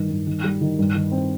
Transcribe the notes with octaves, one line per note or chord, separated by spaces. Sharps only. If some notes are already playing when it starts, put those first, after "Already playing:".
Already playing: G2 D#3
G2
D#3
G3
D#3
G2
D#3
C4